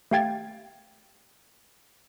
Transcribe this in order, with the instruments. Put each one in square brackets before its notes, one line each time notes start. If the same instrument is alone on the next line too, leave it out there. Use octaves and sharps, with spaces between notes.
[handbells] A3 G4 F5 G5 G#6 A6